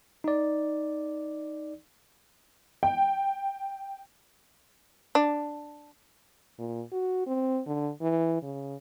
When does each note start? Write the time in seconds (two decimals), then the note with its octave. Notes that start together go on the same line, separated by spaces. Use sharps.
0.24 D#4 D5
2.83 G5
5.15 D4
6.59 A#2
6.92 F#4
7.27 C4
7.67 D3
8.01 E3
8.43 C#3